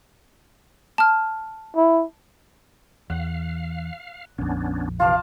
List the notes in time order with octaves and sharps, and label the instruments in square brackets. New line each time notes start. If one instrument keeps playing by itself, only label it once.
[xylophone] A5 F6
[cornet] E4
[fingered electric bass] E2 [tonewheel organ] F5 [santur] F#5
[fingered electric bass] A#1 F2 [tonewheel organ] B3 C#4 D4
[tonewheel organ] C3 E3 [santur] F4 A5 D6 [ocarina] F5